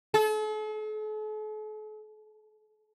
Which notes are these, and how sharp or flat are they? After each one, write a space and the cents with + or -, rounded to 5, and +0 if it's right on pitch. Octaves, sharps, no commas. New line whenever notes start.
A4 -45